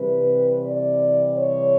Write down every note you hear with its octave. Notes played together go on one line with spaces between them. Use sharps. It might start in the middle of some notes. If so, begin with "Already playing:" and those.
Already playing: C3 E3 G3 C4 B4
D5
C#5